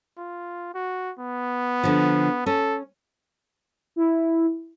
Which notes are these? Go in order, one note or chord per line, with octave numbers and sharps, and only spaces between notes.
F4
F#4
B3
D3 F3
C#4 A4
E4